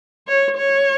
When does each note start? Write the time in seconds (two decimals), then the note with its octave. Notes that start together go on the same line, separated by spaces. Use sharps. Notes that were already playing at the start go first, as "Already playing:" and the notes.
0.27 C#5
0.57 C#5